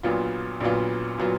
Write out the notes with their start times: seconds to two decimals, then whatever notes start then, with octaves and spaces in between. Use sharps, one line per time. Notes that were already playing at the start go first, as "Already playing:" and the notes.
0.03 A#1 A#2 F#3 B3 F4
0.61 A#1 A#2 F#3 B3 F4
1.18 A#2 F#3 B3 F4